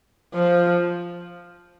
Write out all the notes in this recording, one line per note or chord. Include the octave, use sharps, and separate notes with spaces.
F3